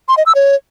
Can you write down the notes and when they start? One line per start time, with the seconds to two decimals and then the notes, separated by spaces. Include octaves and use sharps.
0.09 C6
0.17 D#5
0.26 E6
0.35 C#5